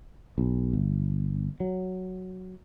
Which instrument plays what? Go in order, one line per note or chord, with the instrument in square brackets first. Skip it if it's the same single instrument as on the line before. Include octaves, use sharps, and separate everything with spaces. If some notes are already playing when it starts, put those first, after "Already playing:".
[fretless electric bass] B1
G1
F#3